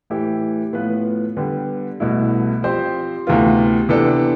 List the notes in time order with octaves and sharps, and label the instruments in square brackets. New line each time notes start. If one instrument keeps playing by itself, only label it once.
[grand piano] A2 E3 A3 E4 G4
A2 F3 B3 F4 B4
D3 G3 B3
C2 B2 A3 E4
F3 C4 G4 C5
D2 C3 E3 B3 F4
C3 E3 B3 D4 A4